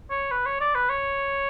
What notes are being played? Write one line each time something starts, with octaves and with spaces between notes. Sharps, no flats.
C#5
B4
C#5
D5
B4
C#5